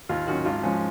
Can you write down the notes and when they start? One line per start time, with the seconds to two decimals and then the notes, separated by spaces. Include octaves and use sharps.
0.09 D#2 F4
0.27 D#3 F#3 C#4 F#4
0.45 G#1 F4
0.63 F3 G#3 C#4